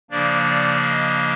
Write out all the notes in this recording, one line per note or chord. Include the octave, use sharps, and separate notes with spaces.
C#3 F3 A#3 D4 D5
D5
D#5